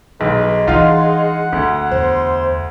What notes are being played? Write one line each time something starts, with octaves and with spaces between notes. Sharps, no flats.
B1 G#3 B4
E3 D4 D#4 F4 F5 F#5
D2 A3
E2 C5